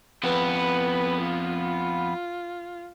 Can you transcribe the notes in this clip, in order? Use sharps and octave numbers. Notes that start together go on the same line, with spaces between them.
F2 B3 B4
F4